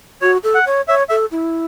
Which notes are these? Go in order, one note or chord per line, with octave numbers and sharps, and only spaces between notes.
F#4 C#5
A4
F#5
C#5
C#5 E5
A4 E5
E4